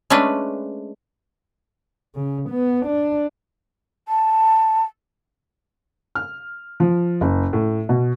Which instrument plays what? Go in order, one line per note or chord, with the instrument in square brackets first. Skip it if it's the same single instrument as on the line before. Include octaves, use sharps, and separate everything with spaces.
[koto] G#3 A3 C#4 D4 B4
[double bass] C#3
B3
D4
[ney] A5
[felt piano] F6
F3
F#1
A2
B2